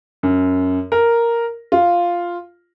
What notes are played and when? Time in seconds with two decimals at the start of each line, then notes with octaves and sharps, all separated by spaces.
0.23 F#2
0.92 A#4
1.72 F4